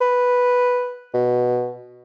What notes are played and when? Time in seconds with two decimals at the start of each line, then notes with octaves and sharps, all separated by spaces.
0.01 B4
1.14 B2